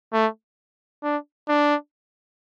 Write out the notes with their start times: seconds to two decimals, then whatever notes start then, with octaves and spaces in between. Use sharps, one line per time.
0.13 A3
1.03 D4
1.48 D4